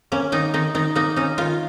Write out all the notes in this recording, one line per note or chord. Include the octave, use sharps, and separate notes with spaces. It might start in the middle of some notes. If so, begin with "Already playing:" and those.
A#3 C#4
D#3 D#4
D#3 D#4
D#3 D#4
A#3 D#4
C#4 D#4
D#3 F4